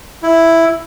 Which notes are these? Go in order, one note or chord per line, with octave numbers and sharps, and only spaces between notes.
E4